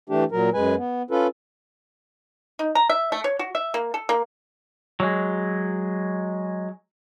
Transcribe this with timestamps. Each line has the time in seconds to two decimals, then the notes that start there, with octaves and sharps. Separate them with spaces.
0.09 E3 A3 D4 G4
0.31 A#2 F#3 A#4
0.53 F#2 G#3 B4 G#5
0.77 B3
1.11 C#4 F4 A4 B4
2.59 D#4
2.75 A#5
2.90 E5
3.12 A3
3.24 C#5
3.39 F#4
3.55 E5
3.74 A#3
3.94 A4
4.09 A#3
5.00 F#3 G#3